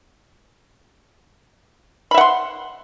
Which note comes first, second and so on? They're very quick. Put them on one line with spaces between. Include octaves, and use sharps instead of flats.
B5 E5 F#5 C6